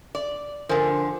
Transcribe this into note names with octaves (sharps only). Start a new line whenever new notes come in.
D5
D3 F3 A#4 C5 G#5